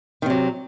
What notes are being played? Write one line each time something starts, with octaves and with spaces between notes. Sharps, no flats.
C3 D#3 F#3